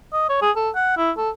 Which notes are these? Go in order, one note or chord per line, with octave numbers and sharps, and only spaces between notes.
D#5
C#5
G#4
A4
F#5
E4
A4